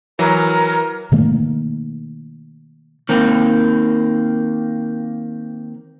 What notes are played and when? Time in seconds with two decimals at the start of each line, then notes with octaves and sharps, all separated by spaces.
0.19 E3 F#3 A#4
1.12 B2 D#3 A3 A#3
3.09 D#3 A#3 C4